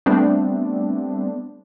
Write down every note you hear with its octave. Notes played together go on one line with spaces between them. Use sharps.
G3 A3 B3 C4 D4